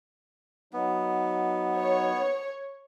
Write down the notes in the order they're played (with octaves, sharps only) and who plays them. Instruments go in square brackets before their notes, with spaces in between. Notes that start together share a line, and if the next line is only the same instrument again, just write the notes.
[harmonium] F#3 D#4 [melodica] B3
[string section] C#5